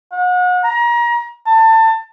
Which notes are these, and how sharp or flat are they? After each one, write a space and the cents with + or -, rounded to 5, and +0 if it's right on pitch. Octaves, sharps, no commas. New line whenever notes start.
F#5 -35
A#5 +30
A5 +25